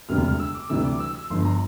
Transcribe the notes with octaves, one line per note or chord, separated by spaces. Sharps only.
E1 D2 C3 G3 F6
F6
E6
D6
D2 C3 E3 G3 E6
D6
E6
E6
G1 G2 F3 C6
A#5